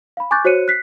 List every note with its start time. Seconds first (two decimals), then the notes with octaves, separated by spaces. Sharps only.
0.17 F5 B5
0.31 G#5 C#6 D6 F#6 G6 A6
0.45 F#4 C5 C#5 F#6 C#7 D#7
0.68 F#6 B6 C7